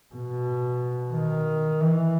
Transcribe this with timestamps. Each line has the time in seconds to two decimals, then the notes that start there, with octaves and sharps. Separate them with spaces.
0.14 B2
1.14 D#3
1.81 E3